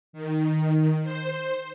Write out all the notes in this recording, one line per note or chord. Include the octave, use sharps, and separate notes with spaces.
D#3
C5